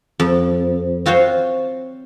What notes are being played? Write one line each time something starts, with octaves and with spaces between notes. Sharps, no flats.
F2
C4 F4 F#4 C5 C#5